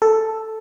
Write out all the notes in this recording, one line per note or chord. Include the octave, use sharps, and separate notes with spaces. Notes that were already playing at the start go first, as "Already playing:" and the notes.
A4